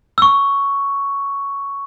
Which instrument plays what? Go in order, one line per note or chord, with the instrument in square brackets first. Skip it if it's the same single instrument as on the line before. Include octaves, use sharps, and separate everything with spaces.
[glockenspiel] C#6 E6